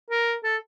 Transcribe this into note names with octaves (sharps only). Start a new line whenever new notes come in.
A#4
A4